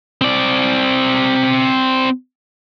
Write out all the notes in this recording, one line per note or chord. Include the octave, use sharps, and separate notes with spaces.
C4 D5